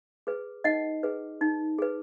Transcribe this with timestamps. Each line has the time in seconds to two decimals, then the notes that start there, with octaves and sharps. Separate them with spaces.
0.27 G#4 B4
0.64 D#4 D#5 F#5
1.03 G#4 B4
1.41 D#4
1.78 G#4 B4